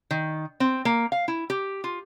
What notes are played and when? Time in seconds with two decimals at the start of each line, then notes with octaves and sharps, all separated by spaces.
0.11 D#3
0.60 C4
0.85 A#3
1.12 F5
1.28 E4
1.50 G4
1.84 F4